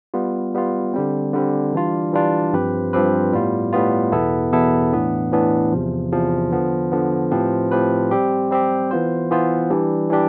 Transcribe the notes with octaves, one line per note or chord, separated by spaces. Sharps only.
G3 B3 F4
G3 B3 F4
D3 G3 C4
D3 G3 C4
E3 G3 D4 F4
E3 G3 D4 F4
G2 F3 C4 G4 B4
G2 F3 C4 G4 B4
A2 G3 B3 F4
A2 G3 B3 F4
E2 B2 B3 E4 A4
E2 B2 B3 E4 A4
A2 E3 B3 D4
A2 E3 B3 D4
E2 C3 F3
E2 C3 F3
D3 F3 B3
D3 F3 B3
A2 F3 C4 G4 B4
A2 F3 C4 G4 B4
G3 C4 G4
G3 C4 G4
E3 B3 F4 C5
E3 B3 F4 C5
E3 G3 D4 G4
E3 G3 D4 G4